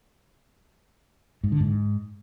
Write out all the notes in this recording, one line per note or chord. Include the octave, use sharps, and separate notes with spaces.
G#2
D3
G#2